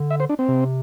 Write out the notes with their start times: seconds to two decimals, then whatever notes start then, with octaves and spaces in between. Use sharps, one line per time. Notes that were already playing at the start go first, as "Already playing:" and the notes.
Already playing: D3
0.10 E5
0.20 C5
0.29 D4
0.39 C4
0.48 C3